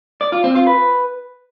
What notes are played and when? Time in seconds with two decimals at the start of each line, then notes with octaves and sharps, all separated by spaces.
0.21 D5
0.32 F4
0.44 C4
0.55 F4
0.67 B4